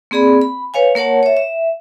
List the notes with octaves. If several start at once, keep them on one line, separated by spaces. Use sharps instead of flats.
A#3 C4 G#4 D5 B5
B5
B4 C#5 F5 G#5
A#3 A#4 C#5 F#5 A5
C#5 E5
E5